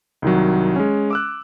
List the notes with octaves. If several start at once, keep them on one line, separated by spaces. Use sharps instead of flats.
C2 D#3 F#3
G#3 C#4
D6 E6 F#6